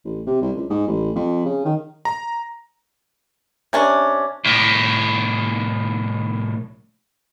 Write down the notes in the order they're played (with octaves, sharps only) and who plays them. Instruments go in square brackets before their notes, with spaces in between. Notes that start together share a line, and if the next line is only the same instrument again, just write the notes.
[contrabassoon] A1
C3
C2
C#2
G#2
A1
F2
C#3
D#3
[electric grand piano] A#5
[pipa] C3 C#4 D4
[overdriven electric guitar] C2 A2